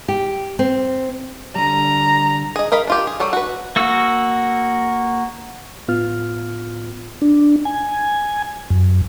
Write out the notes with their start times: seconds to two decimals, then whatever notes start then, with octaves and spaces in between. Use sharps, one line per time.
0.08 G4
0.59 C4
1.56 D3 G3 A#5
2.56 G#4 D#5
2.72 A#4 D#5 F5 B5
2.87 D4 F4 G4
3.07 G#4
3.20 F#3 G3 A4
3.33 F#4 B4
3.76 A#3 F#4 E6
5.88 A2 B3 F4 F6
7.22 D4
7.65 G#5
8.70 F#2